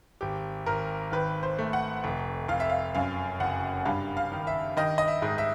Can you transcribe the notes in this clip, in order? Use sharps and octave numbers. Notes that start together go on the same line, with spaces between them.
G#1 G4
G#1 A#4
D#3 B4
C5
A3
F#5
F1
F1 F5
E5
F5
F#2 F5
F#1 F#5
G2 F5
F5
D#3
E5
D#3 D#5
D#5
E5
G#2
E5